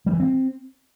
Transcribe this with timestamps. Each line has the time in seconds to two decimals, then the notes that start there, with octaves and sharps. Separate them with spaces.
0.06 G3
0.13 E3
0.20 C4